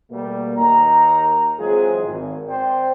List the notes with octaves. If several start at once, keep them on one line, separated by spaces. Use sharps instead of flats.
B2 G3 A3 A#3
D#2 D#4 A#4 A#5
E3 F#3 G#3 C4 F4 G#4
G#1
C4 C5 D5 G5